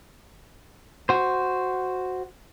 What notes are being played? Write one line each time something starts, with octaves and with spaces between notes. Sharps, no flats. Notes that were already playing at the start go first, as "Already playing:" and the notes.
F#4 C5